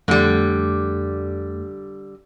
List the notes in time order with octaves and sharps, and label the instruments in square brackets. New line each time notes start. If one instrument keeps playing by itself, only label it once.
[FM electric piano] F2 A3 [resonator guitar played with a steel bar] D3 G3